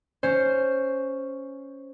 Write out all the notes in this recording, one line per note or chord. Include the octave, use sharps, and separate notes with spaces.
C#4 C5